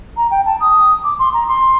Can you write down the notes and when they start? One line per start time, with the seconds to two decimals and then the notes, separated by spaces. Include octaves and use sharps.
0.17 A#5
0.31 G5
0.45 A5
0.60 D#6
1.03 D6
1.19 C6
1.33 A#5
1.48 C6